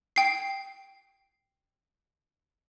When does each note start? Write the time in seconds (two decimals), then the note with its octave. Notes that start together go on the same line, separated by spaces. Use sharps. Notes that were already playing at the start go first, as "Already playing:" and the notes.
0.16 G5 C7